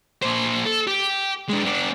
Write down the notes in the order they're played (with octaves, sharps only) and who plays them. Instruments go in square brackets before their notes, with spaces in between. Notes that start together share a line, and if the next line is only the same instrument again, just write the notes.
[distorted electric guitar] A#2 C5
A4
G4
G#3 D4
B3 D4